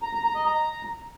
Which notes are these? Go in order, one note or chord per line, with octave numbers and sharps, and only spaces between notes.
A#5
A#5
A#5
D#5
A#5